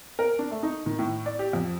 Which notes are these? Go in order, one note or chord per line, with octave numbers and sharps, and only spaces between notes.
A#4
D4
A3
D#4
D#3
A2
D5
G4
F2